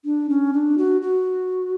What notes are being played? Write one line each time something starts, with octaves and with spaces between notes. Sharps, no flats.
D4
C#4
D4
F#4
F#4